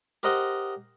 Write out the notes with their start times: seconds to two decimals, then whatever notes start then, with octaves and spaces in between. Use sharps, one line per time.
0.23 G4 A#4 C5 D#5 F#5